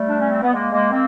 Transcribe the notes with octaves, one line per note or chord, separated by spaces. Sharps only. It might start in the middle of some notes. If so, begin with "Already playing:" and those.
Already playing: G3 A3
D4
C#4
C4
B3
G#3 A#3
G#3 A#3
A#3 C4